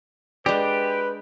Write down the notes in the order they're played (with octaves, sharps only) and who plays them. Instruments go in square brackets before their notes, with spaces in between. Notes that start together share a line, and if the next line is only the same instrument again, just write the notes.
[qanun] G#3 D4 [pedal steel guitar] G4 [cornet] B4